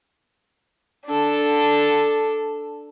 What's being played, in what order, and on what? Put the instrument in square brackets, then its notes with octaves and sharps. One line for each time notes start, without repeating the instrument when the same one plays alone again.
[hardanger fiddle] D4 A4